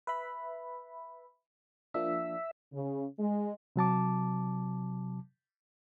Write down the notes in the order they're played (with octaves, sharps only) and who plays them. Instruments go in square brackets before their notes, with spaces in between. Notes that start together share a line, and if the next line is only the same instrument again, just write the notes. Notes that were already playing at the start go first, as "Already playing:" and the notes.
[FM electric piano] B4 E5 B5
[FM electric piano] F3 A#3 D4 [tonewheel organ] E5
[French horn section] C#3
G#3
[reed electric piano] C3 F#3 A5 D6